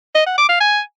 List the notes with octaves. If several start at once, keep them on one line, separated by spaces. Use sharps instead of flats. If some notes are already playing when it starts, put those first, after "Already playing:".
D#5
F#5
D6
F5
G#5